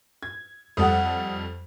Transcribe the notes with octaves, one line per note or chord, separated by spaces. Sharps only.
G#6
F2 G3 A4 F#5 D#6